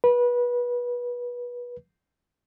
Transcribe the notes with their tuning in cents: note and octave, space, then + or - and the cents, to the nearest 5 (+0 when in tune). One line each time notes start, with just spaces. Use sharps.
B4 -25